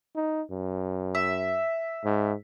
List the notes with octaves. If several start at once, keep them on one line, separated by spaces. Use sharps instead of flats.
D#4
F#2
E5
G#2